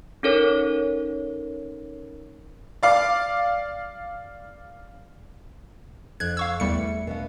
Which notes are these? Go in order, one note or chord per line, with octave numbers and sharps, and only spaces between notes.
C#4 D#4 A4 A#4 C#5
D5 F5 D6
F2 F#6 G#6
F5 C#6 E6
E2 G3 A3 C#7
B2 B3 F5